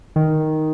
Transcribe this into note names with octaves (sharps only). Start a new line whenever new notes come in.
D#3